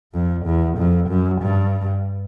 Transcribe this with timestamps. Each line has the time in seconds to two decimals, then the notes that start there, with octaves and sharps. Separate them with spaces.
0.14 F2
0.46 E2
0.78 F2
1.09 F#2
1.41 G2